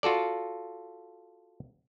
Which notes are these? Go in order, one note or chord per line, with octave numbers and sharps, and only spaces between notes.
F4 F#4 A4 D5